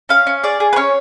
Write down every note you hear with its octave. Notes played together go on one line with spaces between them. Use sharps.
C#4 F5
C#4
G#4 D5
G#4
B4
C#4 C#5